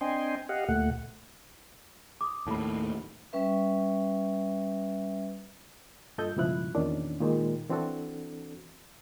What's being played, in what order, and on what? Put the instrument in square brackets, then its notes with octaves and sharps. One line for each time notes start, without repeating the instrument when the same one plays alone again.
[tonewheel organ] C4 D4 D#5 G5 G#5 C6
G4 D#5 F5 F#5
D2 A#2 A3 F#5
[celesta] D6 D#6
[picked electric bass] D#2 A2 [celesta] A5 B5
[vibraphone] G3 C#4 B4 E5
[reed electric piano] G2 A#2 F4 A4 D#5 G6
C#2 G2 B2 F3 E4 F#6
E2 A#2 D#3 C#4 D4
A#2 D#3 G#3
E3 C4 D4 F#4 A4